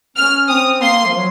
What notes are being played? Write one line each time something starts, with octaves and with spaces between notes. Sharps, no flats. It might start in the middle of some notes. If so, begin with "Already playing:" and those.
C#4 F6
C4 D#6
A#3 C6
F3
F#3